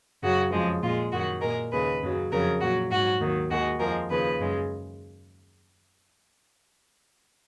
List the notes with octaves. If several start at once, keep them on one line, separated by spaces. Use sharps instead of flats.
F#2 C#3 F#3 F#4
F2 C#3 F3 G#3
A#2 G#3 F4
F#2 D#3 F#3 F#4
A#2 G#3 A#4
D#2 C#3 G#3 B4
F#2 C#3 F#3
F2 C#3 F#3 A#4
A#2 F#3 F#4
G#2 F#3 F#4
D#2 D#3 F#3
D#2 D#3 G#3 F#4
F2 F3 G#3 A#4
D#2 C#3 F3 B4
F#2 C#3 G#3